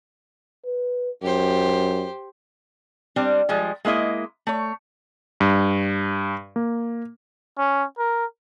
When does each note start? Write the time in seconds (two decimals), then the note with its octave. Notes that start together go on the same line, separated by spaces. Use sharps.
0.65 B4
1.23 F#2 G4 C5
3.16 G3 C4 D4
3.49 F3 G3 G#3
3.85 G#3 A#3 E4 D#5
4.47 A3 C#5
5.40 G2
6.56 A#3
7.58 C#4
7.98 A#4